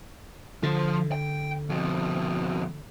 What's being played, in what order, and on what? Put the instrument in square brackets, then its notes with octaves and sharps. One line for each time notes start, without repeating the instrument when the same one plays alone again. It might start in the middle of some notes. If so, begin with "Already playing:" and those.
[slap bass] D3 [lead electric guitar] F3 F4
[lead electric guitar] G5
F2 B2